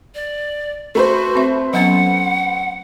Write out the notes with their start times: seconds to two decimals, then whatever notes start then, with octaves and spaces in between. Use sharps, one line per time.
0.15 D5
0.95 A3 F#4 B4 C5
1.35 C4 E5
1.73 F#3 B3 C#4 F#5